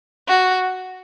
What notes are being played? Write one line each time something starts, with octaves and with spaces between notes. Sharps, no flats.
F#4